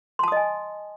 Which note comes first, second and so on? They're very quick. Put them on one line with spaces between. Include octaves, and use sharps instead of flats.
C6 A5 D#6 D#5 G#5